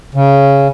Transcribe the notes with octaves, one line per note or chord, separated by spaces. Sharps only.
C#3